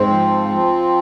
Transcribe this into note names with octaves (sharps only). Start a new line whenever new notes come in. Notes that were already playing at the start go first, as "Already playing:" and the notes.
Already playing: G#2 C4
F3
F3